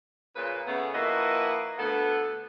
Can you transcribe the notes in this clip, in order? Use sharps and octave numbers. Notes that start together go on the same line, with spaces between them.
A#2 C#3 B4
C#3 A3 B3
F3 A#3 E4 F#4 B4 D#5
D2 B3 A4